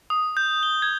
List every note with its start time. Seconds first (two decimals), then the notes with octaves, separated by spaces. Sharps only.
0.10 D#6
0.37 G6
0.63 G7
0.82 G#6